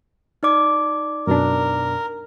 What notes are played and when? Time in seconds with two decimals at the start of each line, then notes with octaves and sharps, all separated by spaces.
0.43 D#4 D5 D6
1.27 F#2 B2 D4 A#4